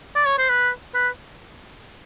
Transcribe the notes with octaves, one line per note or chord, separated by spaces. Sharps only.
D5
C#5
C5
B4
B4